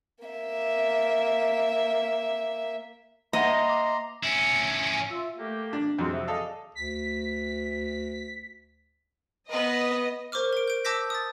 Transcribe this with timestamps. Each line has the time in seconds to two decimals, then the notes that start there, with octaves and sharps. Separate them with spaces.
0.25 A#3 E5
3.33 A#3 D#5 E5 F#5 A#5 C6
3.69 D6
4.23 C#4 E4
5.10 F4 E5
5.37 A3 A#3 G4
5.73 D4
5.99 F2 F#3 G#3 C4
6.11 C3 F#4 E5
6.28 G#4 A4 D5 D#5 F5
6.75 D2 B6
9.50 B3 B4 D#5
10.32 A#4 C5 C#6 D6 F6
10.53 A#4 D7
10.68 G6 D7
10.85 A5 D6 E6 G6 A#6 B6
11.10 D#6 A6